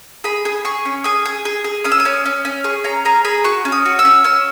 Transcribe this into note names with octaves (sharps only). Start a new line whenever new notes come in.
G#4 B5
G#4
G#4 C#6
C#4
G#4 D#6
G#4
G#4
G#4
C#4 D#6
E6
D#6
C#4
C#4
C#4
G#4 C#6
C#4 A#5
G#4 A#5
G#4 B5
F#4 C#6
C#4
D#6
F#4
E6
C#4
C#4 E6